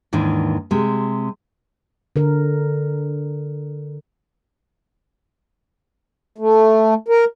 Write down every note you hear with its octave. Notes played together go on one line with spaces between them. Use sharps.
D#2 G#2 D#3 E3 D4
C3 G#3
D3 A#4
A3
A#4